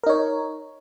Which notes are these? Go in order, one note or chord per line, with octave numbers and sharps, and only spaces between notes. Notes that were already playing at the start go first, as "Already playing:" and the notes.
D#4 A#4 C#5